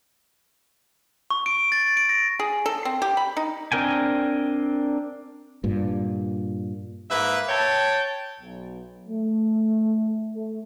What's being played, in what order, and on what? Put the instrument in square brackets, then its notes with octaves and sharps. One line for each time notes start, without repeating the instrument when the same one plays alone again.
[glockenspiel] C#6
D7
A6
D7
A#6
[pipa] G#4
A4
C4
G4
B5
D#4
[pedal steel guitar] C4 D4 A#4 G5 G#5
[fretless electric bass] G2 A#2
[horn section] G#2 A#3 B4 E5
C#5 G5 A5
[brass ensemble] B1
A3
A3